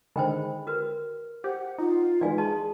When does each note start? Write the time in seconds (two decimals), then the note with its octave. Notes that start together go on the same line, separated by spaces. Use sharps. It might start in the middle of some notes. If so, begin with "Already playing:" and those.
0.16 D3 D#3 G#3 C5 G5 B5
0.67 F#4 A#4 B4
1.44 G4 C5 F#5
1.78 D#4 F4
2.21 D#3 E3 G#3 D5 F5 G#5
2.38 G#4 D#5 A5 C6